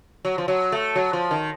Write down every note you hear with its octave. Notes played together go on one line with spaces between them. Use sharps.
F#3
F3
F#3
A3
F#3
F3
D#3